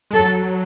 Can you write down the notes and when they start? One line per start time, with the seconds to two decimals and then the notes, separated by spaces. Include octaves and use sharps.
0.11 G#3
0.15 F#3 A4